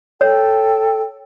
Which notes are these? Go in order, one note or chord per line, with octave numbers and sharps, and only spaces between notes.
A4 C#5 G5